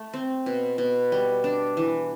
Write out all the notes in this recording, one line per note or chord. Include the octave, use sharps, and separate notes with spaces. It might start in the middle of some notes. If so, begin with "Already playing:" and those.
Already playing: A3
C4
B2
B2
G3
D4
E3